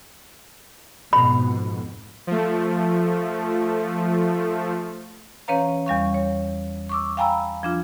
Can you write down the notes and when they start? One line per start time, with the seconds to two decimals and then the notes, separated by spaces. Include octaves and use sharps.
1.13 F2 G#2 B2 B5
2.27 F3 A3
5.48 E3 C#4 B4 C#5 F5 A#5
5.86 E2 G3 F5 C#6
6.14 C#5
6.89 C#6 D6 E6
7.17 F5 G5 G#5 A#5 B5 E6
7.63 F3 D4 F4